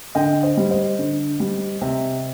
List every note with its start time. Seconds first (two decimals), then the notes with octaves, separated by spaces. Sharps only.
0.15 D3 D#5 G5
0.43 C5 D#5
0.57 G3
0.70 C5 D#5
0.99 D3
1.40 G3
1.81 C3